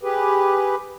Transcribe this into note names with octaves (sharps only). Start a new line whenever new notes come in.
G4 G#4 B4